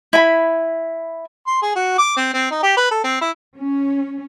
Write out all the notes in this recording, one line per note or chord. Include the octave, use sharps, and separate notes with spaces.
E4 G#5 B5
C6
G#4
F#4
D6
C4
C4
D#4
G4
B4
A4
C4
E4
C#4